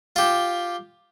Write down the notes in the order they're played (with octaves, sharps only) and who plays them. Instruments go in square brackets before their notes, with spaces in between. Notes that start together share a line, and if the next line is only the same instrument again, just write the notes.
[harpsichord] F4 G4